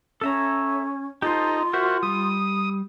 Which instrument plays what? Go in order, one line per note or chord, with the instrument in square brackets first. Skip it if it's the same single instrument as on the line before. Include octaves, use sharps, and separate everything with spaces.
[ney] C#4 [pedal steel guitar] A4 E5 A#5
[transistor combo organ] D#4 [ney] F4 [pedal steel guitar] G4 A4 C5
[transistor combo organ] F#4 [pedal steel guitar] A#4 C5 E5
[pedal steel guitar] G3 [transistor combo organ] D#6